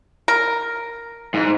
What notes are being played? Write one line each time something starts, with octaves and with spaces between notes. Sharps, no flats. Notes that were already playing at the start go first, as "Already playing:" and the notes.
A#4
G#2